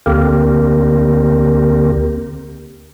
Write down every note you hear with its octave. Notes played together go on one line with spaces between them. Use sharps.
D2 D3 A#3 C4 G4 A#4